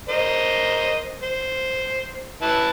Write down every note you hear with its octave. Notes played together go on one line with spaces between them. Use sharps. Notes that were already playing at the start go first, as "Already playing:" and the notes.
A#4 C5 D#5
C5
E4 B4 A5